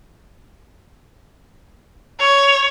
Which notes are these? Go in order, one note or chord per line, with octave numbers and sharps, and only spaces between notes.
C#5